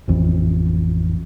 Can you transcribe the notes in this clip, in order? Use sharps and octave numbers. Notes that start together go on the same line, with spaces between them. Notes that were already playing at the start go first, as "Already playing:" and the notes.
A1 F2 E3